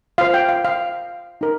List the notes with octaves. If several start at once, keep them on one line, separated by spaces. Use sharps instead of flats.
F4 C5 F5
G5
F5
F5
D#4 A#4